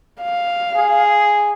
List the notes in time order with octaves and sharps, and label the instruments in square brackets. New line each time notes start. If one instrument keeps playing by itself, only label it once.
[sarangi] F5
[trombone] G#4